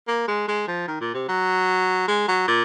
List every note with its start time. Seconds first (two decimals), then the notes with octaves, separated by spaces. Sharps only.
0.08 A#3
0.28 G#3
0.48 G#3
0.67 F3
0.88 D#3
1.01 A#2
1.14 C3
1.29 F#3
2.08 G#3
2.28 F#3
2.48 A#2